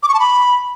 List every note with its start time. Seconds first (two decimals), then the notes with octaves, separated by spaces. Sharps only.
0.03 D6
0.08 C#6
0.14 A5
0.20 B5